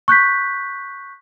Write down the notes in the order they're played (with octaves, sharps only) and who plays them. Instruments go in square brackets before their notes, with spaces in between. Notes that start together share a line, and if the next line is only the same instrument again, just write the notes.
[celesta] C#6 F#6 G6 B6